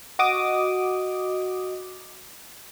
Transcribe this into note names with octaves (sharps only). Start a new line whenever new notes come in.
F#4 D#5 D6 D#6